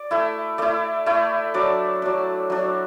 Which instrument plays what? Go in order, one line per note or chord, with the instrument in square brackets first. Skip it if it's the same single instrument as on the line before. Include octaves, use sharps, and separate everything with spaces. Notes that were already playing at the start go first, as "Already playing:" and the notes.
Already playing: [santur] D5
A3 E4
A3 E4 D5
A3 E4
F#3 D4 D5
F#3 D4
F#3 D4